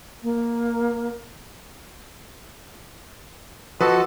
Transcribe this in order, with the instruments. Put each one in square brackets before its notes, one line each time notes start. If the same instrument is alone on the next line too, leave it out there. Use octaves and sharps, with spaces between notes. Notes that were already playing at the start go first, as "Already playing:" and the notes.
[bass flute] A#3
[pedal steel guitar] F3 F#4 [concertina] A4 D#5 A5 [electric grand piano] B4